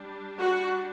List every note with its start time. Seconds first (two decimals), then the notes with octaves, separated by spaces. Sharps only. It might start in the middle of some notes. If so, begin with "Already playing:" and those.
Already playing: G3 D4
0.38 F#4